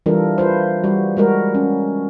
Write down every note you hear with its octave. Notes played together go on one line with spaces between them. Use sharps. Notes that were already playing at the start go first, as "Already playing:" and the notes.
E3 G3 D4 F4 A4 A#4
F4 B4 C5
G3 F#4
G3 G#3 F#4 A#4
C#4